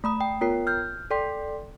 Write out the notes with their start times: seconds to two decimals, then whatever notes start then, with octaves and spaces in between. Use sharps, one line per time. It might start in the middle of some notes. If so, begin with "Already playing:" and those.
0.04 A3 B5 D#6
0.21 G5
0.41 B3 F4 A#4 C#5 G5 C7
0.67 F6 G6
1.11 A4 D5 G5 C6 B6